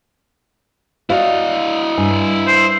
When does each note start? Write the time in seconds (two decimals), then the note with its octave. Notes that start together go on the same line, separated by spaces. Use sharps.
1.10 E4 F#4 D5 D#5 F5
1.98 G2 G#5
2.47 C5